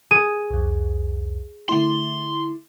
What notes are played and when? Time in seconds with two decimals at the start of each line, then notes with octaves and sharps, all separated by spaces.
0.11 G#4 D#7
0.51 C2 F2
1.69 D3 A3 E4 C6